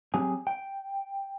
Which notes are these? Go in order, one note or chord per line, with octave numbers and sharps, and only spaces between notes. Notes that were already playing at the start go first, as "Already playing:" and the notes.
F#3 C4 G4 G#4 G#5
G5